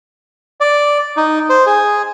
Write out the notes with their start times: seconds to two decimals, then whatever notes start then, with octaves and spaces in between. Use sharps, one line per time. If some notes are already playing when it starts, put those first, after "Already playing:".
0.60 D5
1.17 D#4
1.50 C5
1.66 G#4